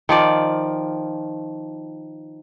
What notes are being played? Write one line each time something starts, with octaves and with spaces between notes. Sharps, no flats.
D#3 F3 D5